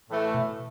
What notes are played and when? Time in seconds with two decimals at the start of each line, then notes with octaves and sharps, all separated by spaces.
0.09 A2 E3 A3
0.34 B2